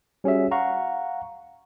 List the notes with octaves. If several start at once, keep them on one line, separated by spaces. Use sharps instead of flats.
G3 C#4 F#4 G#4 E5
F5 F#5 A#5 C#6